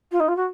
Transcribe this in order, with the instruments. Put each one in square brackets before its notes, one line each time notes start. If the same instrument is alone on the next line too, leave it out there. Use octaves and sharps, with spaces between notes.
[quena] F4
D#4
F4
F#4